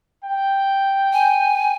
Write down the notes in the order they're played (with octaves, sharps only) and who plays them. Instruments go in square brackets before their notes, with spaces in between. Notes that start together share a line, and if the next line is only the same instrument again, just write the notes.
[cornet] G5
[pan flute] G#5